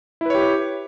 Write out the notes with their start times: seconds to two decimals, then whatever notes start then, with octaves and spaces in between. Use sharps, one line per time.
0.21 E4
0.26 B4
0.30 C#5
0.35 G4